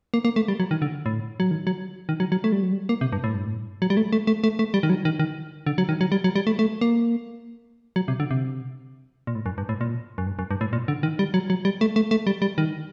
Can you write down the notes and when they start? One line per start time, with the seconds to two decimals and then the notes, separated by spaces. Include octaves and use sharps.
0.14 A#3
0.25 A#3
0.36 A3
0.48 G3
0.60 F#3
0.71 D#3
0.82 D3
1.06 A2
1.40 F#3
1.51 D#3
1.67 F#3
2.09 D#3
2.20 F#3
2.32 F#3
2.44 A3
2.52 G3
2.62 F#3
2.72 G3
2.89 A#3
3.01 C3
3.12 G2
3.24 A2
3.34 G2
3.46 A2
3.82 F#3
3.90 G3
3.97 A3
4.12 A3
4.27 A3
4.44 A3
4.59 A3
4.74 G3
4.83 D#3
4.90 F#3
5.05 D#3
5.19 D#3
5.66 D3
5.78 F#3
5.89 D#3
6.01 F#3
6.12 G3
6.24 F#3
6.36 G3
6.47 A3
6.59 A3
6.81 A#3
7.96 F#3
8.08 C3
8.20 D3
8.31 C3
9.27 A#2
9.35 A2
9.46 F#2
9.58 G2
9.69 A2
9.81 A#2
10.18 F#2
10.27 G2
10.39 F#2
10.51 G2
10.61 A2
10.73 A#2
10.88 D3
11.03 D#3
11.19 G3
11.34 F#3
11.50 F#3
11.65 G3
11.81 A3
11.96 A3
12.11 A3
12.27 G3
12.42 G3
12.58 D#3